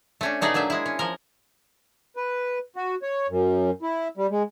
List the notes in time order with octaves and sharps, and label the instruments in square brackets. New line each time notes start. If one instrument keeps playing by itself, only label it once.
[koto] A3 C#4 D4
B2 A3 D#4 G#4 D5
F#3 A#3 D4 E5
G#3 E4
C#4
F3 A#4
[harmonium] B4
F#4
C#5
F#2
E4
G3
G#3